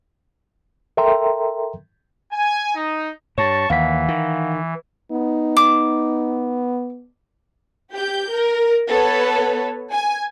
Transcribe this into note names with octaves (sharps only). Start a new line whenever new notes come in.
A4 A#4 E5 G5 A#5 C6
G#5
D#4
G2 C#5 A5 C#6
D#2 E3 F5 F#5 B6
D#3
B3 D#4
D6
G4 G6
A#4
B3 A4 B4 C#5
G#5